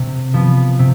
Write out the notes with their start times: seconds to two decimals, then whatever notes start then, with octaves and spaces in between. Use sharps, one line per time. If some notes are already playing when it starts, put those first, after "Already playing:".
Already playing: C3
0.34 F3 B3
0.79 C3